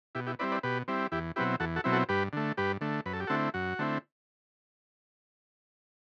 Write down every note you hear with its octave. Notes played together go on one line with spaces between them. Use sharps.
B2 E4 G4
E4 G4
G3 C4 E4 B4 D5
B4 D5
B2 G4 B4
G3 C4 E4
E2 E4 G4
B2 F#3 C4 E4 G4 B4
E2 F#4 A4
F#4 A4
B2 F#3 C4 E4
F#4 A4
G2 G4 B4
D3 A3
G2 G4 B4
D3 A3
F#2 B4
A4
G4
D3 A3 C4 E4 F#4 A4
F#2 F#4
D3 A3 C4 E4